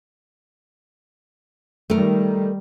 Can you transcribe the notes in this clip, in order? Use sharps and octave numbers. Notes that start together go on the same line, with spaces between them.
D#3 G3 A3 A#4